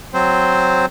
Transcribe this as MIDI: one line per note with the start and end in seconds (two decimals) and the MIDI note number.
0.14 0.86 54
0.14 0.86 60
0.14 0.86 72